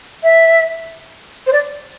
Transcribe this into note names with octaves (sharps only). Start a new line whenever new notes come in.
E5
C5
D5